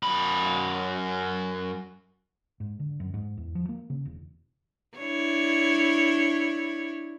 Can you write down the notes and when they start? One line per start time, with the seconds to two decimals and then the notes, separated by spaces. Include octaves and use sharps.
0.03 F#2 B5
2.60 G#2
2.79 D3
3.00 F#2
3.14 G#2
3.37 E2
3.55 F3
3.69 A#3
3.90 C#3
4.05 E1
4.98 D4 E4 C#5